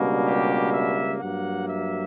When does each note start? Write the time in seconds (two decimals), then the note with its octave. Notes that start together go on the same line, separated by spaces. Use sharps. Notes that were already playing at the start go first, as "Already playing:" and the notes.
Already playing: C#2 B2 G3 A#3 D4
0.25 G4
0.73 E5
1.20 G2 F#3 A#3 F#5
1.68 E5